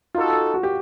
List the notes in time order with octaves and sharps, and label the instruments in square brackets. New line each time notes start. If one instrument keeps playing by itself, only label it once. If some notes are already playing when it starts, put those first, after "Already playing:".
[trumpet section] D#4 F#4 A4 [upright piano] F4
[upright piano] F#4
G4